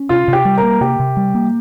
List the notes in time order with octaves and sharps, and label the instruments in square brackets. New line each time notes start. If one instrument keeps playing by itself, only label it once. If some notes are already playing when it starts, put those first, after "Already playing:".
Already playing: [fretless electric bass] C#4
[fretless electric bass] C3 [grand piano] F4
[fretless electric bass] C3
[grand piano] G4
[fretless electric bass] G3
[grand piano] A#4
[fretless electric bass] A#3
[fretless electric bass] C3 [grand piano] G4
[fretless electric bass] C3
G3
A#3